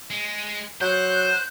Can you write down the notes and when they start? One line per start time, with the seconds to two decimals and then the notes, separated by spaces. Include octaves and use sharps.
0.10 G#3
0.81 F#3 C5 F#6 G6